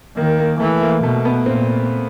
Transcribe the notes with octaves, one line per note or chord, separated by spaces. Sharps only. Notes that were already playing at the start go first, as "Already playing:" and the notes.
D#3 A#3
A#3
E3 A3
A#3
B2 A3
B3
A#2 C4